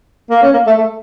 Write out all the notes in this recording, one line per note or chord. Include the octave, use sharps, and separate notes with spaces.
A#3
C#4
A#3
A3
A3